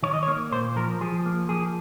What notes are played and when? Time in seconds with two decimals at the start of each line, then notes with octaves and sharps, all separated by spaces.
0.03 D#3 C#5
0.14 D#5
0.23 C#5
0.27 A#3
0.52 A#2 C5
0.76 F3 A#4
1.01 F3 G#4
1.26 A#3
1.49 F3 G#4